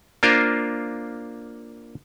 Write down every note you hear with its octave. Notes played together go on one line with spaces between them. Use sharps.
A#3 D4 F4 A#4 C5